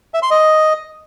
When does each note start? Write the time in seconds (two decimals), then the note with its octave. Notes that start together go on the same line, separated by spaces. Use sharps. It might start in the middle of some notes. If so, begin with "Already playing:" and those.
0.14 E5
0.22 C6
0.31 D#5